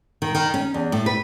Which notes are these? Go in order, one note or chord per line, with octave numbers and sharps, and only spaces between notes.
D#3
D#3
C#4
E2
A2
B4